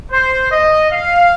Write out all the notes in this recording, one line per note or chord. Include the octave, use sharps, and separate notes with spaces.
C5
D#5
F5